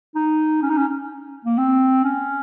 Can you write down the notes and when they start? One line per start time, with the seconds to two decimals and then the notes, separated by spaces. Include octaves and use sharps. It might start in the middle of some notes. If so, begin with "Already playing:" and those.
0.15 D#4
0.62 C#4
0.70 D#4
0.77 C#4
1.45 A#3
1.58 C4
2.04 C#4